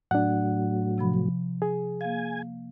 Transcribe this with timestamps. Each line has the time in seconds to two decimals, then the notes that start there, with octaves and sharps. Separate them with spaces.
0.11 A2 F#3 D4 F#5
0.98 C3 F3 B5
1.62 G#4
2.01 A#3 F5 G#5